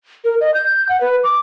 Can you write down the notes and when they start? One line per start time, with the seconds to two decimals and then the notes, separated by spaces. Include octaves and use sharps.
0.25 A#4
0.41 D#5
0.54 G6
0.89 F#5
1.01 B4
1.24 D6